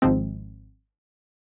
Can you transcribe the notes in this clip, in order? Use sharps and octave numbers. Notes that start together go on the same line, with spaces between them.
G#1 G#2 F3 G#3 C4